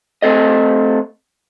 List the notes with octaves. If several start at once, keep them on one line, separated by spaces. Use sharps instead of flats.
A3 C4 A4 D#5